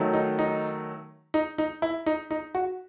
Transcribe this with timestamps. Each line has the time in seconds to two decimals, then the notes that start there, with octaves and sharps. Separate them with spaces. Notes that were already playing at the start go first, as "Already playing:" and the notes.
Already playing: D#3 F#3 A3
0.14 D#4
0.39 D#4
1.34 D#4
1.58 D#4
1.82 E4
2.06 D#4
2.31 D#4
2.55 F#4